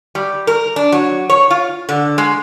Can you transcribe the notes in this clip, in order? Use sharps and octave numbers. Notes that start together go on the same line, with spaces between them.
G3
A#4
D4
F#3
C#5
F4
D3
G#3